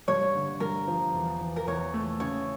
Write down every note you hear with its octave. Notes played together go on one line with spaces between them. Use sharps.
G2 C#5
D3
G2 A#4
F3
E2
E3
A#4
E2 C#5
A3
C#3 C#5